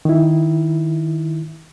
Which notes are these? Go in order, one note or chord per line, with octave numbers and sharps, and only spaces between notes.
D#3 E4